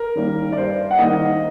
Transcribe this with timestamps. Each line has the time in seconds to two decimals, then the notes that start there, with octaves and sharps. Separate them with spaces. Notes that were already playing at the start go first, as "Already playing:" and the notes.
Already playing: A#4
0.15 D#3 G3 A#3
0.52 D5
0.57 G2 C5
0.91 F#5
0.98 D#3 G3 A#3 D#5